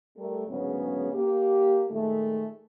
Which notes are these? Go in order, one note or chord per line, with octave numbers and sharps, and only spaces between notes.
G3 A3 A#4
D2 G#2 C#3 F#3 B3 C#4
A#3 G4
A#2 D#3 G#3 A3